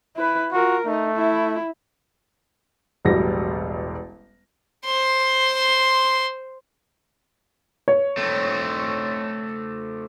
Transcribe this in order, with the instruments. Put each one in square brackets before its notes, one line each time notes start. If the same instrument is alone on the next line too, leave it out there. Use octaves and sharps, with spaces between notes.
[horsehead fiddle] E4 B4
[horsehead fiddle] F4 A#4 [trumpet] F#4
[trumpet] A3 [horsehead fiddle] D#4
[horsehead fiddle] E4
[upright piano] E1 A1 F#3 G3 A#6
[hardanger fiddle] C5 C6
[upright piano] C#5
[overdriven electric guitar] A3 C4